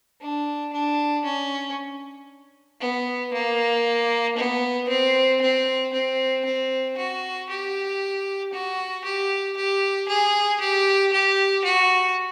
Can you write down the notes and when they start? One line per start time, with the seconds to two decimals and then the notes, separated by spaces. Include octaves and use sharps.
0.21 D4
0.73 D4
1.25 C#4
2.81 B3
3.33 A#3
4.37 B3
4.89 C4
5.42 C4
5.93 C4
6.45 C4
6.97 F#4
7.49 G4
8.53 F#4
9.05 G4
9.57 G4
10.08 G#4
10.61 G4
11.13 G4
11.64 F#4